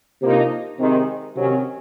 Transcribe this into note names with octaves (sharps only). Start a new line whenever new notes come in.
C3 F3 A#3 D#4
C3 D#3 G#3
C3 D#3 F#3 C#4